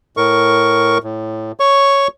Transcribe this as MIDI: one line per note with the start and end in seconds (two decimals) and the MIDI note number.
0.17 0.98 45
0.17 0.98 70
0.17 0.98 85
1.03 1.52 45
1.60 2.08 73
1.60 2.08 85